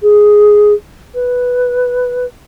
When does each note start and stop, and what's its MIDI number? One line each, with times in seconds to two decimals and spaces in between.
0.02 0.72 68
1.14 2.26 71